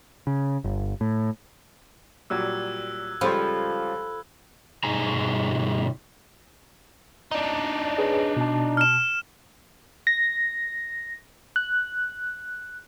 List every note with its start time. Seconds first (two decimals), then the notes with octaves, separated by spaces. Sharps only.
0.27 C#3
0.64 G1
1.01 A2
2.30 A#2 F#3 G3 E6 F#6 G#6
3.21 C#2 F3 G3 A4 B5 C6
4.84 G2 B2 D#4 G#4 G#5 A#5
7.31 D4 D#4
7.98 G#4 B4 C#5
8.37 B2 A5
8.77 F6 E7
10.07 A#6
11.56 F#6